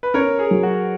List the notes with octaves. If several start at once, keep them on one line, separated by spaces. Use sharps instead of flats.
B4
C#4 A#4 C#5
G#4
F#3
F#4